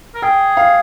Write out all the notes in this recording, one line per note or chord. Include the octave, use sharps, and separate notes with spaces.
A#4
G#4 G5
F5